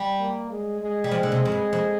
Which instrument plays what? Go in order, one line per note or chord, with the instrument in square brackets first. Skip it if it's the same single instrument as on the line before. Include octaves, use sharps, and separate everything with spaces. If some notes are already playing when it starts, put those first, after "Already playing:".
Already playing: [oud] G3
[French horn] A#3
G#3
G#3
[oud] G3
F3
D3
C3
F2
G2
F2